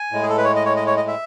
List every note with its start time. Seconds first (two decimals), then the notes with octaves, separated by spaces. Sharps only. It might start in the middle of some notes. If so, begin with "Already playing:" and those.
Already playing: G#5
0.12 A2 G#3
0.23 G#4
0.29 A4
0.38 B4
0.44 C#5
0.56 D#5
0.66 C#5
0.77 D#5
0.87 C#5
0.97 D#5
1.08 E5